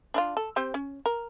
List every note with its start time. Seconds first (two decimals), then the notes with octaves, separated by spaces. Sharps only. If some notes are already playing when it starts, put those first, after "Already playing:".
0.14 D4 E4 F4
0.37 A4
0.56 C4 G4 C5
0.74 C#4
1.06 A#4